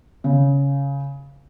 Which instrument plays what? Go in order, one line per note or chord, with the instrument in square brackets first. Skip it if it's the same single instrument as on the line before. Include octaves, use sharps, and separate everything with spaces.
[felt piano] C#3